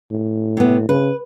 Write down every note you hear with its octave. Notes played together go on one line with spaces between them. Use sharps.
A2
C3 B3
C#3 B4